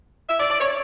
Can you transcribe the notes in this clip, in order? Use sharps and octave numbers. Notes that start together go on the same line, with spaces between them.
E5
D5
D5
C#5